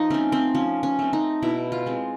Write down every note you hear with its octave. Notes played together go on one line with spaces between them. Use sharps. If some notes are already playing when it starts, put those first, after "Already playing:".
Already playing: F3 D#4
A3 C4 C#4
C4
F3 C#4
C#4
A3 C4
D#4
B2 E4
F4
G#3 C4